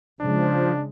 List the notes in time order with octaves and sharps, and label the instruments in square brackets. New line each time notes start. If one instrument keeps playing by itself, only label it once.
[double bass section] C#3 G#3 [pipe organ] F3 [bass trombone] D4